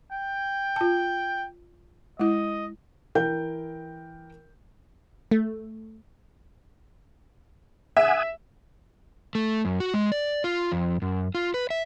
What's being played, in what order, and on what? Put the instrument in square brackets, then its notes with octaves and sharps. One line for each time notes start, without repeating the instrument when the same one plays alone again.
[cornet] G5
[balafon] F4 A5
[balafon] G#3 E4 [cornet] D#5
[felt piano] E3 A#4 G5 G6
[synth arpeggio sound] A3
[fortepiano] E5 [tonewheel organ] F#5 G#5 D#6
[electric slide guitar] A3
F#2
F#4
G#3
D5
F4
F2
F#2
F4
B4
E5